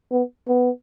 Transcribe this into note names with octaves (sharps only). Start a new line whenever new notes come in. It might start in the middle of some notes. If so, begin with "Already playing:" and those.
B3
B3